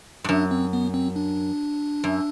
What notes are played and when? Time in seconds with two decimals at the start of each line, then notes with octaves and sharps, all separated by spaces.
0.24 G2
0.29 F#2 D4
0.51 C4
0.73 B3
0.94 C4
1.16 D4
2.04 F#2